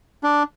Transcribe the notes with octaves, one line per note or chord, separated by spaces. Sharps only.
D4